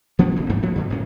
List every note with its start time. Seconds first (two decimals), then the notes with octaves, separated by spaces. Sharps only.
0.19 F3 B3 C#4 D4
0.36 D#1 B1 E2
0.50 A#1 G2 G3 A3
0.63 F3 A3 B3
0.76 F#2 D3 F#3
0.90 A1 D2 A2 C#4